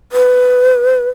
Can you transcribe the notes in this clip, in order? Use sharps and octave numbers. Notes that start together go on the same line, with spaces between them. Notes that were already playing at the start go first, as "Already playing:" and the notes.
B4